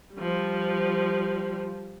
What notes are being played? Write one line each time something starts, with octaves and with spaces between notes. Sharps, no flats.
F3 G3